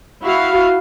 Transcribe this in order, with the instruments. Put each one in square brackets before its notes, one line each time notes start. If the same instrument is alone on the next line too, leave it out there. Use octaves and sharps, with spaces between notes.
[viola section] E4 F#4 F5